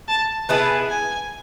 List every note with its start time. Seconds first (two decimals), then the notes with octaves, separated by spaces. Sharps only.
0.08 A5
0.48 B3 E4 G#4 B4 A5
0.89 G#5